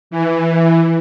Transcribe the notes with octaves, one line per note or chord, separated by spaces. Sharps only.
E3